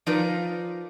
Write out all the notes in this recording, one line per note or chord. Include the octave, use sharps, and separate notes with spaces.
F3 D#4 F4 A#4 B4 D5